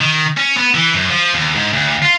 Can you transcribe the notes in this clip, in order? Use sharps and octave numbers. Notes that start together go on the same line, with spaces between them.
D#3
C#4
B3
E3
F#2
F3
D#2
G#2
D2
F4